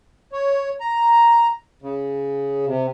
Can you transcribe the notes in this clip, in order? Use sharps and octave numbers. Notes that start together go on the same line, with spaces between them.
C#5
A#5
C#3
C3